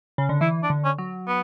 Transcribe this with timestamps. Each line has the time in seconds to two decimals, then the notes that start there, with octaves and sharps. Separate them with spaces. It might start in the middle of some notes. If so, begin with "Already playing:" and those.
0.18 C#3
0.29 D3
0.41 E3 E4
0.63 D4
0.70 D3
0.84 C#4
0.98 F#3
1.28 B3